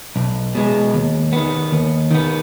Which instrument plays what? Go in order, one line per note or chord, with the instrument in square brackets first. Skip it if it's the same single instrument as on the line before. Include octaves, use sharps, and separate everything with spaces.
[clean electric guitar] B1
B2 G#3
D#2
D#3 B3
D#2
D#3 B3